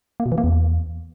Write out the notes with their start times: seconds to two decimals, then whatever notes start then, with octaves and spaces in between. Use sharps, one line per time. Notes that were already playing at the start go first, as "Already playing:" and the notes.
0.20 A#3
0.26 B2
0.32 E3
0.38 A#3
0.44 E2